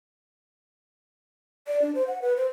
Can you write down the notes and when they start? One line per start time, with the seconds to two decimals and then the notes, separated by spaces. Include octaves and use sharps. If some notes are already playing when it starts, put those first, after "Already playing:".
1.68 D5
1.82 D4
1.95 C5
2.07 F#5
2.22 B4
2.37 C5